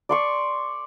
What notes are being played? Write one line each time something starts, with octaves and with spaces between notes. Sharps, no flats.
D5 C6 C#6